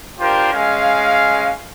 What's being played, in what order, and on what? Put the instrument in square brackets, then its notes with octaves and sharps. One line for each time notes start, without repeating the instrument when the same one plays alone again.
[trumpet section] D4 F4 G4 A#4 C5
G#3 C#4 F5